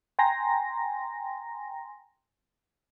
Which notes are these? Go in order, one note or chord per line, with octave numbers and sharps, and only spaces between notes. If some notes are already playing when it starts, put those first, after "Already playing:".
G5 G#5 A#5 C6 A#6